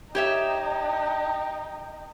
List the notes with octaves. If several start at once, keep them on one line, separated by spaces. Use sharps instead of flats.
D#4 G4 C#5 E5 G5